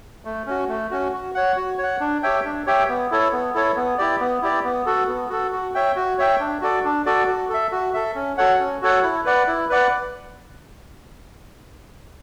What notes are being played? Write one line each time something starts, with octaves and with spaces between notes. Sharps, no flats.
A3
C#4 F#4
A3
C#4 F#4
F#4
C#5 F#5
F#4
C#5 F#5
D4
G4 C#5 E5 G5
D4
G4 C#5 E5 G5
B3
E4 A4 C#5
B3
E4 A4 C#5
B3
E4 G4 D5
B3
E4 G4 D5
B3
F#4 A4
B3
F#4 A4
F#4
C#5 E5 G5
F#4
C#5 E5 G5
D4
F#4 A4 D5
D4
F#4 A4 D5
F#4
A4 E5
F#4
A4 E5
C#4
F#4 A4 C#5 F#5
C#4
F#4 A4 C#5 F#5
E4
B4 D5 F#5
E4
B4 D5 F#5